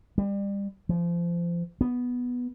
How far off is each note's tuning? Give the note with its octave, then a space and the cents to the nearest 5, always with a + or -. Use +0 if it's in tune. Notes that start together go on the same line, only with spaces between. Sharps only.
G3 +30
F3 -30
B3 -5